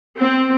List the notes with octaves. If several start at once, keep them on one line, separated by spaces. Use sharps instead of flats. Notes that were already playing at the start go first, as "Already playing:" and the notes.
C4